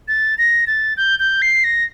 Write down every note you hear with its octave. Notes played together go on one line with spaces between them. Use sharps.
A6
A#6
A6
G6
G6
C7
A#6